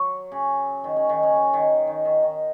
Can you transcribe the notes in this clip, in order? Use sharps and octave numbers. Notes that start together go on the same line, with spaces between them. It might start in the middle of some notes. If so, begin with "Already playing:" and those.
Already playing: F#3
C#3
D#3
C#3
D#3
C#3
C#3
D#3
D#3
D#3
D#3